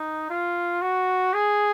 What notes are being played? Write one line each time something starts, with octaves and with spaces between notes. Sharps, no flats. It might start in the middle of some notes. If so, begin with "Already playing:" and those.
Already playing: D#4
F4
F#4
G#4